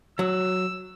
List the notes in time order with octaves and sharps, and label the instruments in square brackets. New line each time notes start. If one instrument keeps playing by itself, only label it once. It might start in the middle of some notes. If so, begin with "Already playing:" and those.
[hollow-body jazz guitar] F#3 [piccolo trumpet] E6